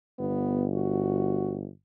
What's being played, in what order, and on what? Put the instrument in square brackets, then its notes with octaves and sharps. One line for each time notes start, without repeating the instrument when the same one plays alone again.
[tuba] G1 [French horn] B3
[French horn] F#4